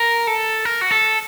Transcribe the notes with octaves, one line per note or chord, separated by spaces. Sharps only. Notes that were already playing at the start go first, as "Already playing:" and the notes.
Already playing: A#4
A4
A#4
F#4
A4